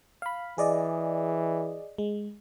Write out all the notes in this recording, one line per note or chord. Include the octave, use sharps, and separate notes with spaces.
F5 B5
E3 G#4 D5 D#5
G#3